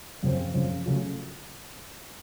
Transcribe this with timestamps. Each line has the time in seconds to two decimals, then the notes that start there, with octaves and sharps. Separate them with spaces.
0.23 F#2 C#3 F3 C4
0.54 F#2 C#3 F3 C4
0.86 C#3 F#3 A3 C#4 F4